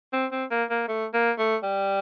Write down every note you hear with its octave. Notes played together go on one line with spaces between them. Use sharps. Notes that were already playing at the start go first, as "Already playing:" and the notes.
C4
C4
A#3
A#3
A3
A#3
A3
G3